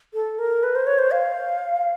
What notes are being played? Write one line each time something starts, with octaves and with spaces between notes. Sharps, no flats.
A4
A#4
B4
C5
C#5
C5
F5